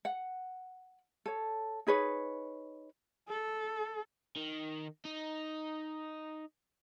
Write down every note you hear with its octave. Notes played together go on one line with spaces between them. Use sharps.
F#5
A4 C#5
D#4 G#4 B4 C#5
A4
D#3
D#4